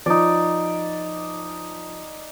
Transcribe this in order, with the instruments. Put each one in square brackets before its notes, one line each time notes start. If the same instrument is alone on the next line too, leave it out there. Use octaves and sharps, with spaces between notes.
[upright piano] F3 [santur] D#4 D5